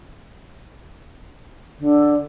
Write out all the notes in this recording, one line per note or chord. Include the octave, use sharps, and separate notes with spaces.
D3